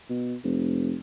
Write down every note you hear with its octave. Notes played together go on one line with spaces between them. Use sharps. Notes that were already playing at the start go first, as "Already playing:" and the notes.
B2
F1